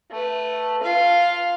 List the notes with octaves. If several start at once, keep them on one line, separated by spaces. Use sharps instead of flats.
A3 B4
F4 F5